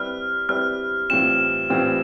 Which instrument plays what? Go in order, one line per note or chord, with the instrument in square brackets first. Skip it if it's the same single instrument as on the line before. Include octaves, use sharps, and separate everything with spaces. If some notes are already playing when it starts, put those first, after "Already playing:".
Already playing: [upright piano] G3 C4 E4 B4 D5 [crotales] F6
[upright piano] G3 C4 E4 B4 D5 [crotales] F6
[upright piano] A2 E3 G3 C4 F4 [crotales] E7
[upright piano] A2 E3 G3 C4 F4